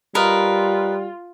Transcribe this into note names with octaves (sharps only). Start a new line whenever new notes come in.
G3 F4 A#4 B4 D#5